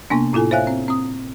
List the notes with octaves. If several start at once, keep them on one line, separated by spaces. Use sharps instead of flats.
C3 A#3 B3 D4
A2 E4 F4 A4 G#5
C5 C#5 E5 F5 G#5 F#6
C4
C4 D#6